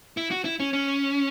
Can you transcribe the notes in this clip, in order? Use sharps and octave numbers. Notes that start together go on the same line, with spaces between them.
E4
F#4
E4
C#4
C#4